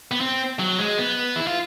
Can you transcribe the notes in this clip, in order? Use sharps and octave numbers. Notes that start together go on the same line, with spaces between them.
B3
C4
F#3
G#3
B3
E4
F4